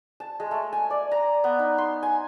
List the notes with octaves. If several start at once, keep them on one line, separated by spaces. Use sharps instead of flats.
A5
G#3
A3
G#5
D5
A#5
B3
D#4
C6
G#5